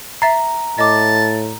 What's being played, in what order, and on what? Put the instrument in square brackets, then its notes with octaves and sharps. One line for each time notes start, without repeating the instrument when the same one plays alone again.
[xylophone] E5 A6 C7 [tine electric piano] A#5
[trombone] A2 [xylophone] D#5 D6 [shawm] A5